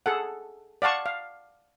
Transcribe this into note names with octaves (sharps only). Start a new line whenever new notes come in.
G#4 A4 F#5
D5 F5 F#5 A5 C#6
F5